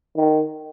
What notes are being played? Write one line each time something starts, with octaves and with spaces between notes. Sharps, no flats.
D#3